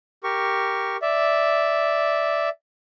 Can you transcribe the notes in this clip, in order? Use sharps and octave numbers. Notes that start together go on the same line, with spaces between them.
G4 A#4 C#6
D5 E5